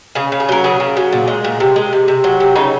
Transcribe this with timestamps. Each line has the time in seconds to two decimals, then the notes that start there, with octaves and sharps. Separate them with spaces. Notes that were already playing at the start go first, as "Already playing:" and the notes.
0.15 C#3 G#4
0.32 C#3
0.40 G#4
0.49 F#3 A#4
0.64 C#3 G#4
0.80 C#3
0.97 F#3
1.12 A#2
1.27 G#3
1.44 A#2
1.60 C3
1.76 G#3
1.93 C3
2.08 C3
2.24 F#3
2.40 C3
2.56 C#3 D#4